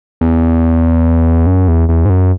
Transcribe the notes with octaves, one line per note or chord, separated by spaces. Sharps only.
E2
F#2
E2
E2
G#2
F#2